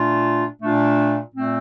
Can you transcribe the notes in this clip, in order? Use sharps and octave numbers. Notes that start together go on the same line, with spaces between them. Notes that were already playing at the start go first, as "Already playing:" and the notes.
Already playing: A#2 A3 D4 F4
A#2 A3 D4 F4
A#2 A3 C4